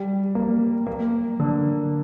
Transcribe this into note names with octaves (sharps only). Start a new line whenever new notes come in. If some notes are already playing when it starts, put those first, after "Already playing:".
Already playing: G3
A#3
A#3
D3